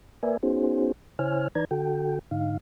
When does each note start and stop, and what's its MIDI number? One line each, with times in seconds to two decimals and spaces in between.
0.23 0.37 58
0.23 0.37 70
0.23 0.37 71
0.23 0.37 74
0.23 0.37 76
0.23 0.37 80
0.43 0.92 59
0.43 0.92 61
0.43 0.92 63
0.43 0.92 66
0.43 0.92 68
0.43 0.92 72
1.19 1.48 49
1.19 1.48 64
1.19 1.48 72
1.19 1.48 73
1.19 1.48 80
1.19 1.48 89
1.55 1.65 52
1.55 1.65 63
1.55 1.65 71
1.55 1.65 74
1.55 1.65 82
1.55 1.65 92
1.71 2.19 50
1.71 2.19 66
1.71 2.19 69
1.71 2.19 79
2.31 2.57 44
2.31 2.57 50
2.31 2.57 63
2.31 2.57 77